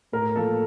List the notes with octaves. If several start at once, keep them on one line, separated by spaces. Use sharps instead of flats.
A2 A#4
F3 A#3 A4